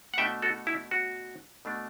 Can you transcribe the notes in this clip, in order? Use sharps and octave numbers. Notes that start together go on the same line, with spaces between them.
F#5
B2 A3 D4 E5 G5
F#4 A4
E4
F#4
B2 A3 D4